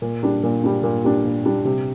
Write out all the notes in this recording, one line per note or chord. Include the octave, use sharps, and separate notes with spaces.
A#2
G3 D4
A#2
G3 D4
A#2
G3 D4
A#2
G3 D4
C3